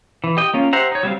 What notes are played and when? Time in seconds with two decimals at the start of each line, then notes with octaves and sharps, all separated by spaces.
0.24 E3
0.37 G4 D#5 G5
0.54 A#3 C#4 F4
0.73 G4 C5 E5 F#5 A#5
0.92 D#4 C#5
1.03 F#3 G3 C4 F5